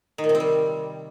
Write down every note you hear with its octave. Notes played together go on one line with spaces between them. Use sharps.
D#3
A#2
C3
C4
G3